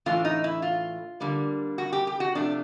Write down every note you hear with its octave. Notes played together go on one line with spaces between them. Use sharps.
A2 E3 A3 D4 F4
D#4
E4
F4
D3 G3 A#3
F#4
G4
G4
F#4
C3 F3 A3 D4